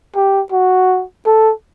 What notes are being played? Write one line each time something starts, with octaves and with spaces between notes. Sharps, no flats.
G4
F#4
A4